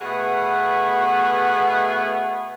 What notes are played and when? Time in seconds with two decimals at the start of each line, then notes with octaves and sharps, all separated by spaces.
0.01 B2 A3 B3 G#4 F#5